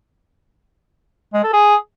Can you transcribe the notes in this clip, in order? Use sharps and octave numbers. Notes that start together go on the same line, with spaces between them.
G#3
A4
G#4